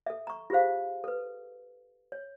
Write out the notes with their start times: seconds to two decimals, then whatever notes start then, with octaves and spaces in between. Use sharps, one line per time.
0.06 A4 E5
0.27 A#5 C#6
0.50 F4 G4 G#4 C5 F5
1.04 A4 B4
2.12 C#5